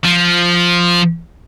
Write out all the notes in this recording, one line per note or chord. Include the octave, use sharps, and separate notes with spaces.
F3